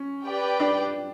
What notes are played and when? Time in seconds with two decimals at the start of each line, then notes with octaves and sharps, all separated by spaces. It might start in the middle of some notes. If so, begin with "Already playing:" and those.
Already playing: C#4
0.25 G4 B4 D5 G5
0.60 D4